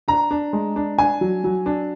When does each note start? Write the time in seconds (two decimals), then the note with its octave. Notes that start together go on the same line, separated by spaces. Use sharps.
0.08 D4 A#5
0.31 D4
0.53 G#3
0.76 D4
0.98 D4 G#5
1.21 F#3
1.44 F#3
1.66 D4